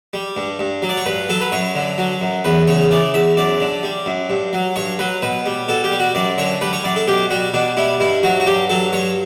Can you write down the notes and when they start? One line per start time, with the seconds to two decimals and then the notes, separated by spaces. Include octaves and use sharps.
0.13 G3
0.37 G2
0.59 G2
0.82 F#3
0.89 D5
0.97 C#5
1.06 G2 B4
1.29 F#3 A4
1.41 B4
1.52 F#2 C#5
1.75 D3
1.98 F#3
2.21 F#2
2.44 E2 B4
2.67 C#3 C#5
2.91 E3 D5
3.14 E2 E5
3.37 F#2 D5
3.60 D3
3.83 G3
4.06 F#2
4.30 G2
4.53 F#3
4.76 G2 C#5
4.99 F#3 B4
5.22 B2 B4
5.46 G3
5.68 B2 A4
5.84 G4
5.91 G3
5.99 F#4
6.15 F#2 D5
6.38 D3 C#5
6.61 G3 B4
6.73 C#5
6.84 F#2 D5
6.96 A4
7.07 B2 G4
7.30 G3 F#4
7.54 B2 D4
7.77 G3 E4
8.00 G2 E4
8.23 F#3 F#4
8.40 F#4
8.46 G2 G4
8.69 F#3 A4
8.92 G2 C#5